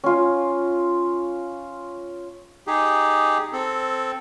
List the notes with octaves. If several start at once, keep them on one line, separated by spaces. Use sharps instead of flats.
C#4 F4
D#4 G4 G#4
C4 A4